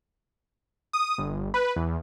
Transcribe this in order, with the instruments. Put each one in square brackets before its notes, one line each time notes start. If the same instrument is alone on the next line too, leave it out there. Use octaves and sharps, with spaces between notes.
[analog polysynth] D#6
G1
B4
E2